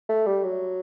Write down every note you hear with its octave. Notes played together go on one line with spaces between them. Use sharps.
A3
G3
F#3